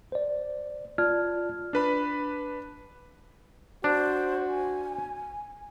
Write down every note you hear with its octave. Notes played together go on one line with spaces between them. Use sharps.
C5 D5
F4 D5 A5 F6 G#6
D4 B4 B5
D4 F#4 C5
G#5